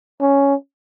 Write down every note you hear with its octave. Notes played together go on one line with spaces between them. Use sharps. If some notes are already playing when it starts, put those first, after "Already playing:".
C#4